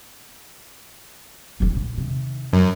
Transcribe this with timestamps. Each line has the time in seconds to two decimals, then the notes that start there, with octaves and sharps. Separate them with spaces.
1.60 D#1 D#3
1.73 A#1 D3
1.98 C3 D#3
2.53 F#2